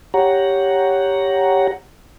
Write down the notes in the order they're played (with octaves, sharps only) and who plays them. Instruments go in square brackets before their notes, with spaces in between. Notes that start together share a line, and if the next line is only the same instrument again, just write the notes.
[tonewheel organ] G4 C#5 F#5 A#5